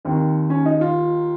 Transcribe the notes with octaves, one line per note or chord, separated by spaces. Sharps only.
D#2 D#3 C4
C#4
D#4
F4